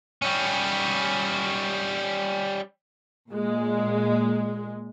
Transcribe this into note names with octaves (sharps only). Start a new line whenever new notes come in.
G3 C#4
A#2 G#3